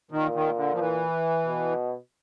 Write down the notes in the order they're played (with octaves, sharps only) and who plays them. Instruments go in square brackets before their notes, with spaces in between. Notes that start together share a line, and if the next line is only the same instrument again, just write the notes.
[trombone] A#2 [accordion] D#3
[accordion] D#3
D3
F3
E3
[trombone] B2